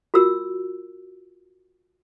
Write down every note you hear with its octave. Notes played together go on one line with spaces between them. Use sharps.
F4 F#4 A#4 E6